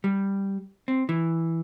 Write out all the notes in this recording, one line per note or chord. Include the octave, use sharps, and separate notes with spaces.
G3
C4
E3